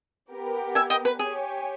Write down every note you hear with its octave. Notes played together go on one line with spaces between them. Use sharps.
B3 G4 A#4
E5 G#5
D#5 G5
B4
G4 G#4 C#5 G#5